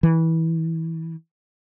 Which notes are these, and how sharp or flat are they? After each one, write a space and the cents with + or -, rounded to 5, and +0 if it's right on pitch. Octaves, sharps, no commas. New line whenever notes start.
E3 -20